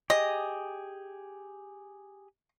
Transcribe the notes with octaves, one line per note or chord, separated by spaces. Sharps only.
G4 G#4 D#5